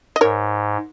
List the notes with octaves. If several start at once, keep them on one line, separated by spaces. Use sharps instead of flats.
D#5
G#2 A#4 C#5